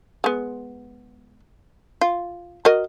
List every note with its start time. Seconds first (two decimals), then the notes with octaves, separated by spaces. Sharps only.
0.24 G#3 B3
2.01 F4
2.65 F#4 A#4 D#5